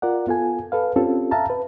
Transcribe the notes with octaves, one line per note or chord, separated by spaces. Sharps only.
F4 A#4 D5 F#5
B3 F4 A4 G#5
A4 B4 F5
C4 C#4 F4 G4 A4
E5 F5 A5 A#5
B4